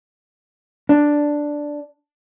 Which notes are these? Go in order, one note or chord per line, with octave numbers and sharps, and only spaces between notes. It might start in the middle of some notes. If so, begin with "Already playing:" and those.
D4